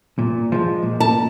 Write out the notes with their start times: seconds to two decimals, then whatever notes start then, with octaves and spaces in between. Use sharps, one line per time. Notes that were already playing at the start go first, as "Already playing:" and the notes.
0.19 A#2
0.52 F3 G#3
0.83 A#2
1.00 A5